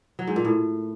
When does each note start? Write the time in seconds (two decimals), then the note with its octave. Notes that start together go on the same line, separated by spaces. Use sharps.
0.19 F#3
0.27 G#2
0.36 A#2
0.45 A2